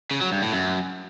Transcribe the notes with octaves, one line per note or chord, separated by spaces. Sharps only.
C#3
F#3
G2
A2
F#2